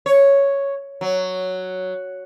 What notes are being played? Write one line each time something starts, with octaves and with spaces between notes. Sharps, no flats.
C#5
F#3